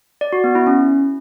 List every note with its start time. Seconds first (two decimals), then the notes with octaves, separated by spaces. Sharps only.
0.21 D5
0.33 F#4
0.44 B3
0.55 E4
0.67 C#4